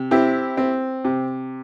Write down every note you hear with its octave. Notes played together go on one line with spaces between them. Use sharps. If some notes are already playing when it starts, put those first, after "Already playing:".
Already playing: C3
C4 E4 G4
C4
C3